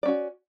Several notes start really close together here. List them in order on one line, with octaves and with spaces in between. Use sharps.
D5 C#4 F#4